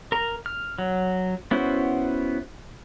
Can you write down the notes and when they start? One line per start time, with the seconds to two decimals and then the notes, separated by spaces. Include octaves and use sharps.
0.12 A#4 A#5
0.46 F6
0.78 F#3
1.51 B3 C#4 E4 F#4 C5